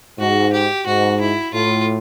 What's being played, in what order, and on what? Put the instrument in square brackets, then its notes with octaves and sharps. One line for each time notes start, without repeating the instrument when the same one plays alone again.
[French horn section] G#2 [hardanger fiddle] F#4
[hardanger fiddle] G4
[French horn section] G#2 [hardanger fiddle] F#4
[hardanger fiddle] E4
[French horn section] A2 [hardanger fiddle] F4